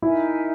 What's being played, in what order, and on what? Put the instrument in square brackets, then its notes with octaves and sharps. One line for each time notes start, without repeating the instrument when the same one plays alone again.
[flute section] D#4 A#4 E5 G#5 [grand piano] E4